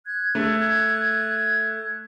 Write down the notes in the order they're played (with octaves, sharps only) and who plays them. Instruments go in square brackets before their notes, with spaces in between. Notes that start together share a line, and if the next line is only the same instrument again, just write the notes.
[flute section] F#6 G#6
[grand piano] A3